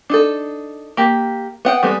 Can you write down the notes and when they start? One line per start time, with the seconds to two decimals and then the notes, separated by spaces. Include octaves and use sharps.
0.10 D4 D#4 A4
0.97 A#3 G4
1.65 B3 F#5 G5
1.83 G3 G#3 B3 A4